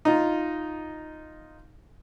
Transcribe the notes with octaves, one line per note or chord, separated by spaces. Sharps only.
D#4 F4